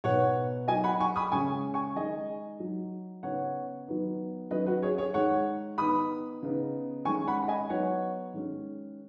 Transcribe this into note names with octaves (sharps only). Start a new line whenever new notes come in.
B2 B3 D#4 C#5 F#5
F#3 D#4 D#5 G#5
F#5 B5
G#5 C#6
B5 D#6
C#3 G#3 C#4 G#5 C#6
G#5 C#6
D#3 G#3 D#4 D#5 G#5
F#3 D#4
C#3 B3 D#4 C#5 F#5
D#3 F#3 B3 D#4
D#3 F#3 C#4 B4 D#5
F#4 B4
G#4 C#5
G#4 C#5
D#3 G#3 D#4 C#5 F#5
D#3 B3 D#4 B5 D#6
C#3 B3 D#4
D#3 G#3 C#4 G#5 C#6
F#5 B5
B5
D#5 G#5
F#3 B3 D#4 C#5 F#5
D#3 G#3 C#4